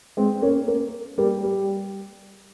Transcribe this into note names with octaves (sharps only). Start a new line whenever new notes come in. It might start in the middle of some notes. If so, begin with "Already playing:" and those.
G#3 C4
A#3 C#4
A#3 C#4
G3 A#3
G3